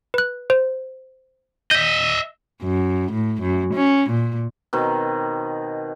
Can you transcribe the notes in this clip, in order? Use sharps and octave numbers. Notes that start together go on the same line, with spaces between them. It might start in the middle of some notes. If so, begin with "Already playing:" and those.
B4 F#6
C5
D#5 E5 G6 B6
F#2
A2
F#2
C#4
A#2
B2 D#3 C4